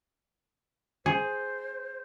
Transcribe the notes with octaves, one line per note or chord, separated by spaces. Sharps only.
G#4 C5